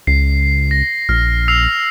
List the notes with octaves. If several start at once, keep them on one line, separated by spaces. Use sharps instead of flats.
C#2 C7
A#6
A#1 F6
E6 C7 F7